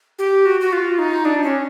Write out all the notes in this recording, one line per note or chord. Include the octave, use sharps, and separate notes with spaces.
G4
F#4
F#4
F4
D#4
D4
C#4